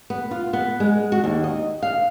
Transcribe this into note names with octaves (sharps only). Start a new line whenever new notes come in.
B3
F4
B3
G#3
F#4
D#2
D#5
F5